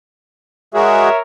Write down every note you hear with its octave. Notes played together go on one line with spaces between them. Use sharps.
G#3 F#4 G#4 A#4 C#5 E5